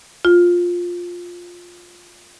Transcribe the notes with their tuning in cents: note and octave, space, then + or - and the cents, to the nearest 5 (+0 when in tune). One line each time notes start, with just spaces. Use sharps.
F4 +10